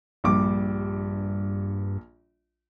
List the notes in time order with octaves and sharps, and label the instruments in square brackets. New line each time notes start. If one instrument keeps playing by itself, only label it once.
[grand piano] A#1 G3 D6 [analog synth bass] G2